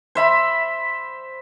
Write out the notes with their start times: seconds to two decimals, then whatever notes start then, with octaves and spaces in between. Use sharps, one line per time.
0.15 C5 E5 B5